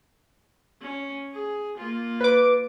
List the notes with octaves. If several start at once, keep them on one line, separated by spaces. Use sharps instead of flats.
C#4
G#4
A#3 F4
B4 D6